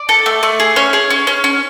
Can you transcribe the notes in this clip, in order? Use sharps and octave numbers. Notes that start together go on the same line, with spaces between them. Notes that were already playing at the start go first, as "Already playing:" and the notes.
Already playing: D5
A4
A3
A3
G#4
C#4 C#5
G#4
C#4
C#4
C#4